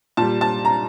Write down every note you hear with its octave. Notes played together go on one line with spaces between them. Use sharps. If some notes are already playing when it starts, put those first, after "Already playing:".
A#2 G3 A5
A5
A#5